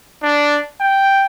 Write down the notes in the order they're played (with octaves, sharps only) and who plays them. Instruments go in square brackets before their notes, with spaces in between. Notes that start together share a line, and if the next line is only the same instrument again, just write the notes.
[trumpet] D4
G5